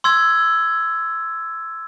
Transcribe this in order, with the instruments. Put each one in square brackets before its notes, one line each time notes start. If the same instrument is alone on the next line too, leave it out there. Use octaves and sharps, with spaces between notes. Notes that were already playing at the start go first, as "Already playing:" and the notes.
[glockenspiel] C6 E6 G#6